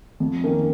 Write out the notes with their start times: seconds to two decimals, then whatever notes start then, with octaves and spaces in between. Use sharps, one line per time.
0.20 F2
0.44 D#3 A#3 C#4